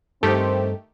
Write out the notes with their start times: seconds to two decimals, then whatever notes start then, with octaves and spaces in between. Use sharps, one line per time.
0.23 G2 D#3 A3 C4 G4 A4